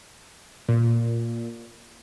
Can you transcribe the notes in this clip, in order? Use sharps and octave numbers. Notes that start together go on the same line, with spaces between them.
A#2